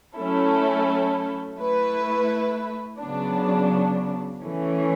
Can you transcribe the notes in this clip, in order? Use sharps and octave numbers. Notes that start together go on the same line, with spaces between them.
F#3 A3 C#4 E4 A4
A3 E4 B4
C#3 F#3 B3 D4
E3 A3 C#4